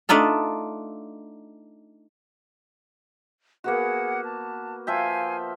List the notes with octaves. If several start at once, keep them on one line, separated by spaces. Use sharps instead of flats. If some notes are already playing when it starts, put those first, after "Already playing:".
A3 D4 D#4 F4 A4
A#3 B3 F#4 G#4 F#5
A5
F3 E5 F5 G5 G#5